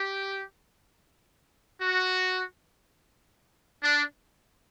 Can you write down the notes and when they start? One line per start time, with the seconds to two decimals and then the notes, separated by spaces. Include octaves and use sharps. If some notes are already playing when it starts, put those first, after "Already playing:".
Already playing: G4
1.81 F#4
3.83 D4